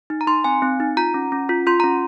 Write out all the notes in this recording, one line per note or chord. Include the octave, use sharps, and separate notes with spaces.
D#4
A#5
D#4 C6
C4 G#5
C4
D#4
F4 A#5
C#4
C#4
F4
F4 C6
C#4 A#5